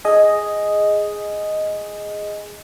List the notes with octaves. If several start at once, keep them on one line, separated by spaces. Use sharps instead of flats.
G#4 D#5 G#5